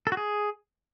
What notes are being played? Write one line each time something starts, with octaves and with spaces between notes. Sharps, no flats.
A4
F#4
G#4